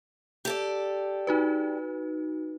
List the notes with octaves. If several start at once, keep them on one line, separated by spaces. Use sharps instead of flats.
G4 A4 D5
D#4 F#4 B4